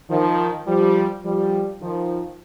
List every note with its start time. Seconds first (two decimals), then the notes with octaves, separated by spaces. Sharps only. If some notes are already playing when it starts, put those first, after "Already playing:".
0.10 D#3 F3
0.67 F3 G3
1.25 F3 G3
1.81 D#3 F3